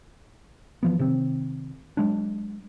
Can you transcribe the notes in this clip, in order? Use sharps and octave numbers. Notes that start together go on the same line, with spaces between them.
E3 F3 B3
C3 D#3 C4
F#3 G#3 D4